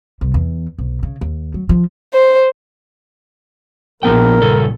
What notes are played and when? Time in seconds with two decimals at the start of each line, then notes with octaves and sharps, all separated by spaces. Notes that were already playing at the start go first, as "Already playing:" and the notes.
0.21 C2
0.34 E2
0.78 B1
1.03 C#3
1.21 D#2
1.54 F#3
1.69 F3
2.14 C5
4.03 A#1 F3 B3 A#4 G5
4.42 G2 C#3 A4